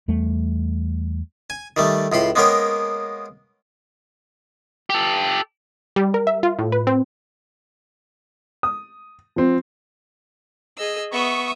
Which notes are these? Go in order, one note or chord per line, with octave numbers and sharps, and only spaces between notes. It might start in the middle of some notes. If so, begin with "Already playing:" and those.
E2 G3 A3
G#5
D#3 G3 A3
C#2 A2 B5 C6
G#3 A#3 B3 C#4 A#4 G5
G4 A4
G3
A#4
E5
F4
A2
B4
C4
D#6
F3 C4
G#4 D#5 E6
B3 E5 C#6 D#6